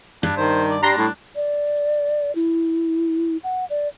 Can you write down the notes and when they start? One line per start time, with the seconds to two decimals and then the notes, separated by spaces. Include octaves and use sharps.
0.23 G2 D4
0.37 D#3 C5
0.70 D5
0.83 G3 D4 A#5 C6 A#6
0.98 A2
1.36 D5
2.35 E4
3.44 F#5
3.70 D5